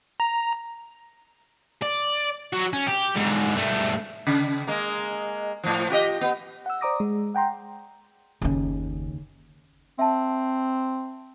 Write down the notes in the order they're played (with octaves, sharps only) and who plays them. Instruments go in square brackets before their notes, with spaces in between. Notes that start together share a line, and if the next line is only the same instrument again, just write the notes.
[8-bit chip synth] A#5
[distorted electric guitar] D5
F#3 F#4
C#4
G4
G#2 D3
G2 A3
[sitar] C#3
G#3 A#3
A2 F3
F4 G4 D#5
B3
[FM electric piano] F#5 E6
C5 D5 A#5 D6 D#6 A#6
G#3
F#5 G5 A#5 C6
[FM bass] F#1 [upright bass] D#2 C#3
[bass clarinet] C4 [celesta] E5 A5